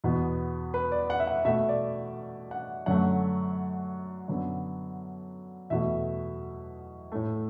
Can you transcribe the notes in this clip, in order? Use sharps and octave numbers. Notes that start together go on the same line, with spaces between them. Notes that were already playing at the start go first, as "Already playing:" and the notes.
E2 B2 B3
B4
D5
F#5
E5
F#5
B2 A3 E5
D5
F#5
F#2 D3 F#3 A3 F#5
F#2 D3 B3
E2 B2 A3 E5
A2 A3